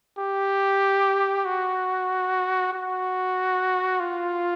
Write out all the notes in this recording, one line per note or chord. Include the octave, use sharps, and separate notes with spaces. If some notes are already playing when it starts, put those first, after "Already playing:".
G4
F#4
F#4
F4